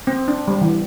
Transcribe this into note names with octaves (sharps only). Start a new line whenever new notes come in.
C4
D4
G3
E3